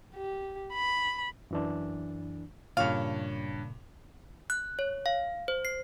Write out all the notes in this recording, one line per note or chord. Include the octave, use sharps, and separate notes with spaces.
G4
B5
F#2 E3 D4
G2 A#2 C#3 C#5 F5 F7
F#6
C#5
F5
C5
C7